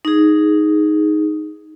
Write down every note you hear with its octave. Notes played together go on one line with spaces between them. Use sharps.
D#4 G#4